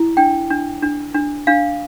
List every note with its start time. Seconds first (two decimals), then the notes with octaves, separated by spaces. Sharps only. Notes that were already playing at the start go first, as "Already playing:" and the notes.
Already playing: E4
0.17 D4 G5
0.50 D4
0.83 D4
1.15 D4
1.47 D4 F5